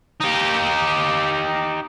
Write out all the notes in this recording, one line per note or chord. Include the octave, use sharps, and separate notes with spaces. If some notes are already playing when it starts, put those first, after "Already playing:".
D#4 G4